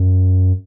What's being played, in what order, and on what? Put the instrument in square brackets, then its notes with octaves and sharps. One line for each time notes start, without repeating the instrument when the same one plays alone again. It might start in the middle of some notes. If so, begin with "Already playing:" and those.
Already playing: [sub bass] F#2